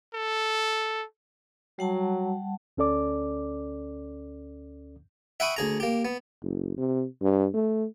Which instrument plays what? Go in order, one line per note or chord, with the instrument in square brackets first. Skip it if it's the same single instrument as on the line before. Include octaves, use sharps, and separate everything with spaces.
[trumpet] A4
[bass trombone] F#3 [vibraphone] G3 F#5 A5
[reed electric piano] D2 C#4 A4 D5 D6
[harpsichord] E5 F#5 G5 B5 C#6 D#6
D2 G#4 A#5
A#3 G4
B3
[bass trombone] F#1
C3
G2
A3